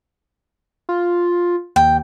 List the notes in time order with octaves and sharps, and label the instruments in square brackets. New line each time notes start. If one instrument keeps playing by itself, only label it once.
[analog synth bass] F4
[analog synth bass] D#2 [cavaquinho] G5